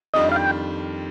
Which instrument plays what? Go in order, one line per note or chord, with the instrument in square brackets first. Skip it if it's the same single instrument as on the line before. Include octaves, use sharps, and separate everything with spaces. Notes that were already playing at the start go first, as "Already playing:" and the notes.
[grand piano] F2 D#3 G3 D4 F4 [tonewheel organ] D#5
[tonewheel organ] F5
G5